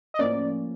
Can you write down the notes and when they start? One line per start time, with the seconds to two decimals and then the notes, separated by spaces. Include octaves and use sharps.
0.14 D#5
0.19 A2 F3 A#3 C#4 D5